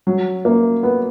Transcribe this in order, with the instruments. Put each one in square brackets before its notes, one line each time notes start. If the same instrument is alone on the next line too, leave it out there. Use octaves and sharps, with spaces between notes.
[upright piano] F#3
A#3
B3